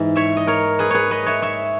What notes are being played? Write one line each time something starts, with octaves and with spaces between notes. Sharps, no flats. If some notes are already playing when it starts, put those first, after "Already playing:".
Already playing: G#2 E3
C#5 E5
D#5
A#4 C#5
G#4 B4
G#4 B4 C#5
B4 D#5
C#5 E5
C#5 E5